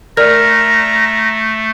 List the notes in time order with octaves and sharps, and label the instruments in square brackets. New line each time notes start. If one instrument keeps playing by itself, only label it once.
[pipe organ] A3 [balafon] A#4 D5 [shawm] A#5 [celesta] F6